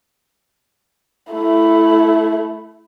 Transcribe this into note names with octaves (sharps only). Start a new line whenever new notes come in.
A3 E4